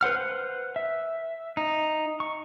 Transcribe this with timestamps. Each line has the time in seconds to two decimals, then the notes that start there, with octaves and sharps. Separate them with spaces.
0.01 B4 C5 F#5 F6
0.76 E5
1.57 D#4
2.20 C#6